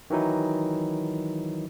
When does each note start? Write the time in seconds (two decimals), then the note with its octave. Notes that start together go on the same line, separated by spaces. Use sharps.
0.10 D#3 E3 F#3 D#4 E4